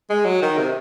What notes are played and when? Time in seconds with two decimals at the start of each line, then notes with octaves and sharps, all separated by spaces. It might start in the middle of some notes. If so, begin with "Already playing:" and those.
0.10 G#3
0.25 F#3
0.42 D#3
0.58 C3